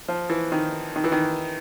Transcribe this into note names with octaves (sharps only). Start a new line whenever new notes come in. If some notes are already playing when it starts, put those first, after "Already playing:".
F3
E3
D#3
D#3
E3
D#3